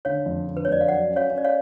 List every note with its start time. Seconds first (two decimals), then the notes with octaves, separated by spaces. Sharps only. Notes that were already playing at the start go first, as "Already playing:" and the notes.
0.05 D3 C#5 F5
0.26 F2
0.47 D3
0.57 B4
0.65 C#5
0.68 F2 D5
0.81 F5
0.88 F#3 D5 F#5
1.10 C#4
1.16 C#5 F5
1.30 C#4
1.38 D5
1.44 C#5 F5